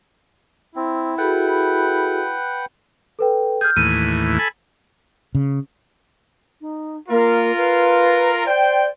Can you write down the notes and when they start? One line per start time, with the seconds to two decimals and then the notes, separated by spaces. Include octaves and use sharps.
0.76 C4 E4
1.18 F#4 G#4 A4 B4 F#5 G5
3.19 A4 B4 G5
3.61 G#4 F6 G6
3.76 D#2 A2 E3 D#7
4.39 A4 G#5 B5
5.35 C#3
6.61 D#4
7.09 A#3 F4 A#4
7.56 B4
8.45 C5 D5 G5